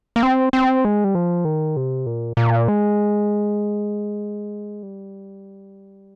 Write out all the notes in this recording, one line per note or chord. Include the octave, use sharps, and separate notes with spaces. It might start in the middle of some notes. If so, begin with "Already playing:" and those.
A#3
C4
C4
G#3
G3
F3
D#3
C3
A#2
A#2
G#3
G3